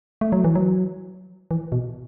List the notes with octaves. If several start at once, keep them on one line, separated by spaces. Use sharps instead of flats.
A3
F#3
E3
F#3
E3
B2